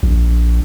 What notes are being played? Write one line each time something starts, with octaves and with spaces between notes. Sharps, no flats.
A#1